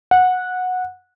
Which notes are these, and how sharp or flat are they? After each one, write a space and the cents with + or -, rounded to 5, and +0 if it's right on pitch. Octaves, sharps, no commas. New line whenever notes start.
F#5 -15